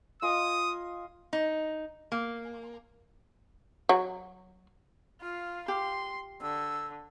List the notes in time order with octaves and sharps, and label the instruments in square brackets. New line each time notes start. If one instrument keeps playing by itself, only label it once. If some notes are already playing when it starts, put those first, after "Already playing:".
[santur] F4 D#5 G#5 [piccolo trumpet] D#6
[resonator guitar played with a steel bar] D#4
A#3
[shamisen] F#3
[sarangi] F4 [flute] F5
[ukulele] G4 [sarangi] C6
[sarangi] D3 [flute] E6